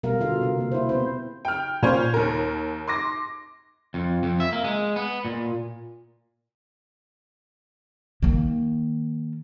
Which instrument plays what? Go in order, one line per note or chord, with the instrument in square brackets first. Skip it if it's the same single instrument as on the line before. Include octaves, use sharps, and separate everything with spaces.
[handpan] B2 G3 A#4 F5
D3 F4 A4 F5
C3 F4 A#4
A#3 A#4
E4 C5
B3 C4 C5
[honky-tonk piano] G5 F6
[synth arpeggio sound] A#2 [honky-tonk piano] C#4 C5 C#5
[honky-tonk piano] D#2 A#4
C6 D6 A#6
[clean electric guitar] F2
F2
E5
A#3
G#3
B3
A#2
[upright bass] D#3 A#3